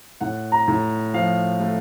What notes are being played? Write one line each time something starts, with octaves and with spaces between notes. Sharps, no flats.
A2 F#5
A#5
A2
F3 F5
A3